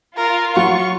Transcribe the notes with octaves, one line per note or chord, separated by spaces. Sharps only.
F4 A#4
F#3 F#5 C#6